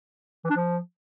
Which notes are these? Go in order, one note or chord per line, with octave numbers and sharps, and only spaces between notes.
E3
D4
F3